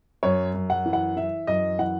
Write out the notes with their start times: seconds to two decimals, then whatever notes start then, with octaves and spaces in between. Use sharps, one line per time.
0.23 F#2 C#5
0.54 F#2
0.70 F#5
0.86 E3
0.93 F#5
1.16 E3 E5
1.47 F#2 D#5
1.79 E3 F#5